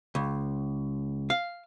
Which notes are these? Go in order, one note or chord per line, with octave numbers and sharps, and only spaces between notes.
C#2
F5